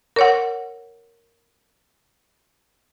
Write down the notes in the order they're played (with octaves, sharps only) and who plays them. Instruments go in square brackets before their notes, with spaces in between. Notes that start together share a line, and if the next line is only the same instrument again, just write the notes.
[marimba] A#4 C#5 F#5